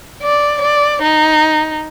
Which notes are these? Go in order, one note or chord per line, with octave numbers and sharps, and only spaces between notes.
D5
D5
D#4